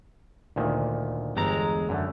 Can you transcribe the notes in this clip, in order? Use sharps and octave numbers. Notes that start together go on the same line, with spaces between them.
D2 A#2 D#3
G1 E2 G#3 A4 G5 A#5
F#2 D3 A3